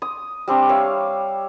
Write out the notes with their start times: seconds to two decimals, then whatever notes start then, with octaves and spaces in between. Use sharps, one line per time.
0.02 D#6
0.48 G3 C4 D4
0.69 C#5 E5 F5